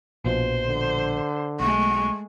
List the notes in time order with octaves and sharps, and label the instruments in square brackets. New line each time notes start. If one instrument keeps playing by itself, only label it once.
[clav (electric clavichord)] A#1 B2 F3 [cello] C5
[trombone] D3
[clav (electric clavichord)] B1 [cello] G#3 A3 [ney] C#6